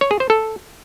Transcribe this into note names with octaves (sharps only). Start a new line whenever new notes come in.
C#5
G#4
C5
A4